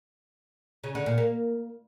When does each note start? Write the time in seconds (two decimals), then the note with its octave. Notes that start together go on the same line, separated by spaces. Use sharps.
0.84 C#3
0.95 D3
1.06 A#2
1.18 A#3